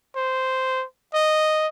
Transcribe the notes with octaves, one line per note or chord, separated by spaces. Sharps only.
C5
D#5